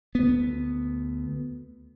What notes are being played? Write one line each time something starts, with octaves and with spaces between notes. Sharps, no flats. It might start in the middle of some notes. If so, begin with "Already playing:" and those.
D2 B3